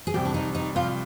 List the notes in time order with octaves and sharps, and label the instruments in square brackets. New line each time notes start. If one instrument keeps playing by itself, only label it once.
[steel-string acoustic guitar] G#4
[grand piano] C2 C3 F3 [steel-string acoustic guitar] G4
[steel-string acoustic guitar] D4
D#4
D#4
[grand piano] C2 C3 F3 [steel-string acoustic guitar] F4